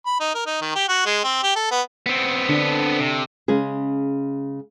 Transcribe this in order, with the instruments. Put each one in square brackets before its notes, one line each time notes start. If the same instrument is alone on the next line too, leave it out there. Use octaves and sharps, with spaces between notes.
[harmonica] B5
D#4
A#4
D#4
D#3
G4
F#4
G#3
C4
G4
A4
B3
[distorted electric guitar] B3 C4
[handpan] D3 D4
[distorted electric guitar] C3
[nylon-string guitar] C#3 G#3 C#4 G#4